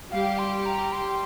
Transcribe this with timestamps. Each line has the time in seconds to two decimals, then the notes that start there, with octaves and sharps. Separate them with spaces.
0.12 G3 G4 F5
0.39 C6
0.66 A#5
0.92 C6